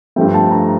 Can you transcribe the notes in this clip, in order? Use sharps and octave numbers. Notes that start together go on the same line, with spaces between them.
G2 F3 A3 G5
A5
A#5